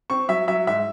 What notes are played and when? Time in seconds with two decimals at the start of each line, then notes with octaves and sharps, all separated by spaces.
0.10 C4 C#6
0.28 F#3 E5
0.48 F#3 E5
0.67 G#2 E5